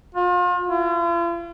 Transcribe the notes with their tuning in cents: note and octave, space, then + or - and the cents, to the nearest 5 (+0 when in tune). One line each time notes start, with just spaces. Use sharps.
F4 +35
F4 -45